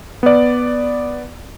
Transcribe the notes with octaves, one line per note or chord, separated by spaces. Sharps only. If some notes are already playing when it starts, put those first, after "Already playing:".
B3 D5